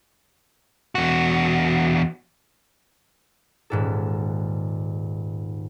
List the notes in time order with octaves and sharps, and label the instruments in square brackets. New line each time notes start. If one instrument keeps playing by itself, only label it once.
[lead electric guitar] E2 F#4
[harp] D#1 G#2 A4